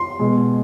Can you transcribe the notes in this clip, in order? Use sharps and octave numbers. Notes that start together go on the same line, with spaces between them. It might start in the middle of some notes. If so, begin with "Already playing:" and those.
Already playing: C6
B2 G#3